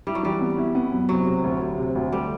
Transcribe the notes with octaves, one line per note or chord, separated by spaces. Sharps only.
G3 E4
F#3
E3 G3
B3
E4
B3
F#2
C3 F#3
C3
D2
D2
C3
D2
G3 A3